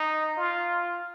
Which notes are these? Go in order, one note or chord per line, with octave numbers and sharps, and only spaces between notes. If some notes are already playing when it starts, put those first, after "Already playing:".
Already playing: D#4
F4